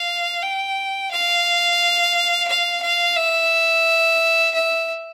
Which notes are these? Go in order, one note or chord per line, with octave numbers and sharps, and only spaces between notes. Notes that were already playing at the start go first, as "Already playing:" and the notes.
Already playing: F5
G5
F5
F5
F5
E5
E5